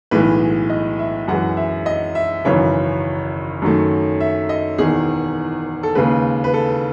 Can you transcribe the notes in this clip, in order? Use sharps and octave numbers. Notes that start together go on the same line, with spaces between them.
B1 A2 E3 G#3 B4
D#5
E5
F#2 E3 G#3 F#5
E5
D#5
E5
G#1 F#2 C#3 E3 C#5
F#2 D#3 F#3 A3
E5
D#5
E1 E2 D#3 G#4
A4
D#2 C#3 G#3 B4
B4
A4